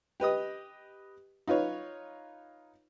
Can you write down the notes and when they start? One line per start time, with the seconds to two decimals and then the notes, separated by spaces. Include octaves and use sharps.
0.20 G4 B4 D#5 D#6
1.48 D#4 F4 B4 C#5